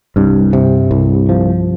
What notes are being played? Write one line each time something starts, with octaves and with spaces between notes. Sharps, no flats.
C2 G2
C3
C2
F3